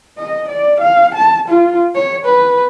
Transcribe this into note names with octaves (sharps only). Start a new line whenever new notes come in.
D#5
D5
F5
A5
F4
C#5
B4